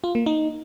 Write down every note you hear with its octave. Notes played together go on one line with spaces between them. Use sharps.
F4
A#3
D#4